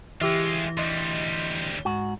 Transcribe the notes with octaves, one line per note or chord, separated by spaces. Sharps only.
E3 G#3 F4 G4 E5
D2 G3 D#5 C6
G#2 F#4